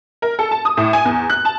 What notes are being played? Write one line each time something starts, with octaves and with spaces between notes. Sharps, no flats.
A#4
A4
A5
D#6
A2
G#5
E2
F#6
A5